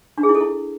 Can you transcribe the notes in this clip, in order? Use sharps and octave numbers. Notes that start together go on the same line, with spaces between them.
D4
G#4
E4
A4
E4